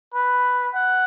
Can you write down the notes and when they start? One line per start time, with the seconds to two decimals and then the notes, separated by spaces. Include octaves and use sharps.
0.14 B4
0.74 F#5